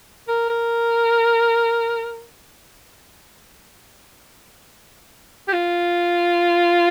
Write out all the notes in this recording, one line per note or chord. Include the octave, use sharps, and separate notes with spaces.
A#4
A#4
G4
F4